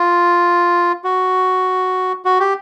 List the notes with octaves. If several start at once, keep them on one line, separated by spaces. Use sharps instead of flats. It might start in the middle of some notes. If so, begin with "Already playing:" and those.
Already playing: F4
F#4
F#4
G4